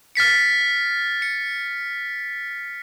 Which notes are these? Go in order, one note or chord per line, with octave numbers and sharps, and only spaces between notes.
F6 A6 B6 C#7
C#7